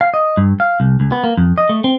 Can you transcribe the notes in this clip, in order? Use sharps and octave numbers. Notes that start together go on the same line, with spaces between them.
F5
D#5
G2
F5
C2
C#2
B3
A#3
F2
D#5
A3
C4